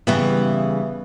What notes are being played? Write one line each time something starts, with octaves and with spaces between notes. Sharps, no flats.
C#3 E3 G3 B3